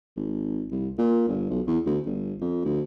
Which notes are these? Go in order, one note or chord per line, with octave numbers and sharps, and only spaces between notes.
G#1
C2
A#2
G1
B1
E2
D2
G1
F2
D2